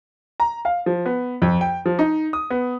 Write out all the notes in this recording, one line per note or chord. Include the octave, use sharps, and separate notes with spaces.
A#5
F5
F3
B3
F2
G5
F3
D#4
D#6
B3